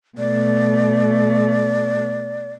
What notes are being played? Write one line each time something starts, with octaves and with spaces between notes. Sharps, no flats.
B2 A3 D5